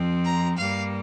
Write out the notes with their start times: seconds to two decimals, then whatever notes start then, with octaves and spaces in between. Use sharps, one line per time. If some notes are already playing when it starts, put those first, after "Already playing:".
Already playing: F2 F3 C4
0.24 A#5
0.57 G2 G3 A#3 F5